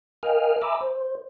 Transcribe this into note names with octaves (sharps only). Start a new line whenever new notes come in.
A#4 D#5 F5 G5 G#5 F6
E5 G#5 A#5 B5 D6 E6
C5